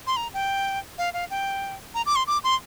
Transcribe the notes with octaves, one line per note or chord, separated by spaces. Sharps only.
C6
A#5
G5
F5
F5
G5
A#5
D6
C6
D6
C6